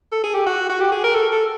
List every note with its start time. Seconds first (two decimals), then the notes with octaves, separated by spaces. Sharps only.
0.12 A4
0.24 G#4
0.34 G4
0.46 F#4
0.70 F#4
0.80 G4
0.92 G#4
1.04 A#4
1.14 A4
1.32 A4